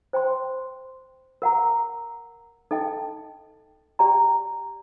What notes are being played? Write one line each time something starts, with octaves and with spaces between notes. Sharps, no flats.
C5 G5 C6
A#4 F#5 A#5
D#4 A4 D#5 G5
G4 D5 G5 A#5